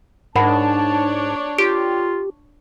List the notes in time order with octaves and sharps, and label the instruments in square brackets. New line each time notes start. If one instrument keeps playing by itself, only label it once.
[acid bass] G#2 [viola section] D4 C#5 [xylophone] A#4 F#5 B5 [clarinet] A5
[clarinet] F4 [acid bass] G4 [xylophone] D7